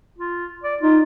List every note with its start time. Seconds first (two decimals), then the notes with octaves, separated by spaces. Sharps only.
0.19 F4
0.64 D5
0.81 D#4 F4